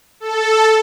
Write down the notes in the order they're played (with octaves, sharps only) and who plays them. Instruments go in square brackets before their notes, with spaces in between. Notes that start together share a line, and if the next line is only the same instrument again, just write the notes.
[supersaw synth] A4